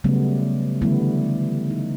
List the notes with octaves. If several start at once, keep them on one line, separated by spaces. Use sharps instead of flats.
C#3 F#3 G3 A3 B3
D3 E3 G3 A3 B3 E4
D#4